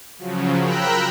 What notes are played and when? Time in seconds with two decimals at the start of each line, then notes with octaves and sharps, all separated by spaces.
0.18 C#3 F3 F#3
0.59 A#4 G5 A#5 B5 E6 F#6